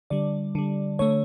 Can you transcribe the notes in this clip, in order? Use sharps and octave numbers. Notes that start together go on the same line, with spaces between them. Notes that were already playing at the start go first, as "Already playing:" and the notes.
D3 G3 D5
D3 G3
D3 A3 C#5